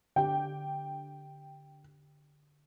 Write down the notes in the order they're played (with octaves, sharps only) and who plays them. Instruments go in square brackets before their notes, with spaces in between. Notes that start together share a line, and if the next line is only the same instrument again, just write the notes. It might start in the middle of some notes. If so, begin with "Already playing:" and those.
[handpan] D3 G4 [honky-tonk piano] G5